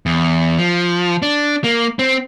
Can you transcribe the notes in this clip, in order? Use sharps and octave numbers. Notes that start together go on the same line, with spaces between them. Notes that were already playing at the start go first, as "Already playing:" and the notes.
E2
F3
D4
A#3
C4